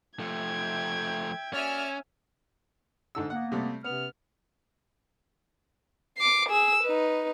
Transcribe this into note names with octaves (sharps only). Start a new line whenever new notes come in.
F3 A3 E5 G5 G#6
A#3 C#4 F#4 D5 E5 G#5 F6
G#2 D3 E6
A#3 B3 F#5
C3 G3 A3
C3 B3 C#4 F6
D6 C7
G#4 E6
D#4 B4